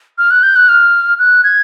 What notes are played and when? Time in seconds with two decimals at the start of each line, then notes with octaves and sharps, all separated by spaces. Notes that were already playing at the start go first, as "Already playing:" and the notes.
0.18 F6
0.31 F#6
0.43 G6
0.56 F#6
0.69 F6
1.19 F#6
1.44 G#6